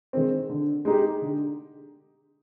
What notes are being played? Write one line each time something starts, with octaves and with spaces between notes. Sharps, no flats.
D#3 G#3 C4
D3
G#3 D#4 G4
D3